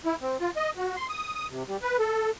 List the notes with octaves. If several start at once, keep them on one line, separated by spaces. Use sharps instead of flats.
E4
C4
F4
D#5
F#4
C6
D#6
D#6
C3
G3
B4
A4